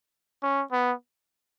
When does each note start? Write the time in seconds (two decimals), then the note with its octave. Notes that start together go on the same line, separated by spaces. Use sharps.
0.43 C#4
0.72 B3